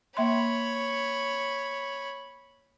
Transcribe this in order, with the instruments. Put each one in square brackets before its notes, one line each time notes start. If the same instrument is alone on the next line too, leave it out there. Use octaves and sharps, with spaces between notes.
[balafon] A#3 E5 C6 [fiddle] C#5 B5